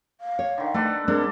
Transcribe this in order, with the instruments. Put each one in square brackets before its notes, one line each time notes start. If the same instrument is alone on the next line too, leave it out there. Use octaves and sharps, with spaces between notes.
[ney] F5
[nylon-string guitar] C#5
[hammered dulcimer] D3 D#3
[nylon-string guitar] A3 [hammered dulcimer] A4 B4 D5
[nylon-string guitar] G#3 C4 D4 [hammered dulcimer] A4 [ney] A#4